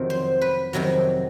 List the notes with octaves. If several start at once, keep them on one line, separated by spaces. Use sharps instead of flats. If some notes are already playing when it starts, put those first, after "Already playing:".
Already playing: F2 C3 D#3 F#3
C5
B4
F2 C3 D#3 F#3